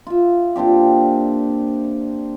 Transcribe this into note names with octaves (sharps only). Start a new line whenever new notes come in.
F4 E5
A#2 C4 D4 G4